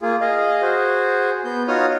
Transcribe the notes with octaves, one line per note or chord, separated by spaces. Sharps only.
A#3 F4 G#4
G#4 D#5 F5
F#4 G#4 C5
B3 G6
D#4 F4 F#4 C#5 D#6 F6